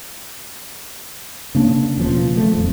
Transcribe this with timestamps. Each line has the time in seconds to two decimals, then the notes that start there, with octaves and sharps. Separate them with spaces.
1.55 C#3 A#3 D4
1.97 E1 C#3 F3 B3
2.36 F3 A3
2.54 D#1 F2